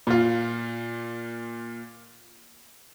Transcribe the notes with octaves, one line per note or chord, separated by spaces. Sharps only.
A#2 F4